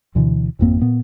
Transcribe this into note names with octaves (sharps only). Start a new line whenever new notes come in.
D2 B2 D3 E3
G#1 F2 A#3 C4
A#2 B3